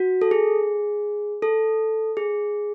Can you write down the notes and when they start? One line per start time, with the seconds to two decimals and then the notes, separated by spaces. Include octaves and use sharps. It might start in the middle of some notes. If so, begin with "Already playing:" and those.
Already playing: F#4
0.22 A4
0.31 G#4
1.42 A4
2.17 G#4